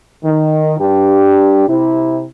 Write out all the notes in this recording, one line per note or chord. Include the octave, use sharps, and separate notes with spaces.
D#3
G2 D4 G4
C3 E4